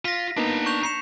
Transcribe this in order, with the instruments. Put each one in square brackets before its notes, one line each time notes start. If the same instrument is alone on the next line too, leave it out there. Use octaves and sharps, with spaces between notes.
[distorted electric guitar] F4 [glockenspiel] A#6 B6
[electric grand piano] A#3 B3 D#4 [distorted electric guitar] D4 A#5
[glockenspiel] C#6 G6 F7
C7 C#7 E7